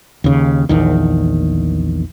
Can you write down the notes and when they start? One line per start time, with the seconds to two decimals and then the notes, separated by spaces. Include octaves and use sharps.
0.24 D#2 C#3
0.69 A#1 E2 D#3